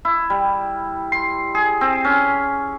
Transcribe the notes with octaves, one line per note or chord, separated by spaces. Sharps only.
E4
G3
C6
G#4
C4
C#4